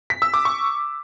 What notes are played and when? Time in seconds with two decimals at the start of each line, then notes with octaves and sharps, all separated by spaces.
0.10 B6
0.22 E6
0.34 D6
0.45 C#6